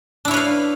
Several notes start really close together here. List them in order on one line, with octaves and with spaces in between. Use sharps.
D4 E4 C#5 B4 F5